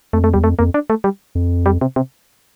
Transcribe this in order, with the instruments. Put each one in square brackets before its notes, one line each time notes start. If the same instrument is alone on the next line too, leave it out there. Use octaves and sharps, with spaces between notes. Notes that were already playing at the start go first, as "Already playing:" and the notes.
[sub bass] F2 [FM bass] A3
[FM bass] A3
[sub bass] E2 [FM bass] G3
[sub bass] F2 [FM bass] A3
[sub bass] F2 [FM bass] A#3
[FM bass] D4
A3
G3
[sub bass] F2
[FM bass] G3
C3
C3